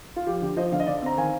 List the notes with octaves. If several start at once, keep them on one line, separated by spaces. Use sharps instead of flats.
F4
F3 G4
D3 G4
F3 C5 D#5
D3 F5
D#5
D3 D5 F5
C4 A#5
D#3 F5 G#5